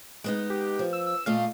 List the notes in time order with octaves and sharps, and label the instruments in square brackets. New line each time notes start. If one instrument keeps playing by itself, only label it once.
[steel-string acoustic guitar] G#3 B3 D#4
[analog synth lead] G4
[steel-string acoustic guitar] F3
[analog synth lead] E6
E6
[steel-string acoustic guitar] A#2 A3 D#5 [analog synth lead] F5